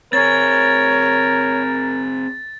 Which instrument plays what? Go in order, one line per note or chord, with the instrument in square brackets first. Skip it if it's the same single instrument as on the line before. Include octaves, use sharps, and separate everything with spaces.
[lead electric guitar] C4 G#4 [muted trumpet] A#4 [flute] C#5 [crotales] A6